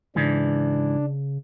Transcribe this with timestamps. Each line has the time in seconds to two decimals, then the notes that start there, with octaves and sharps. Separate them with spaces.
0.16 G#2 C#3 E3 D4